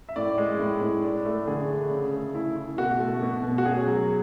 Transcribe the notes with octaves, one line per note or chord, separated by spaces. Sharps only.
E5
A2 D5
G#3
A2
A2
D4
A3
D3 G#4
D4
C#3
A3
E4
E4
B2 F#4
A3
B2
B2
F#4
C#4 G#4
F#3